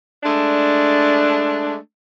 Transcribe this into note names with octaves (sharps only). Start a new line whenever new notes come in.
G#3 A3 D4